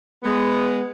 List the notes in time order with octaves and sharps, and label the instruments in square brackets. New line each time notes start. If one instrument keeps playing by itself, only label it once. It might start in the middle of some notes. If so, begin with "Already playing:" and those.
[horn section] G#3 B3